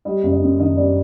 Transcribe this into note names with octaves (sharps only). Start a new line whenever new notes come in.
G3 D#5
F#1
D#5
F#2
D#3 D#5
G3 D5